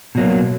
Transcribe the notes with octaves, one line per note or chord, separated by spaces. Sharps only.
B2 F#3 A#3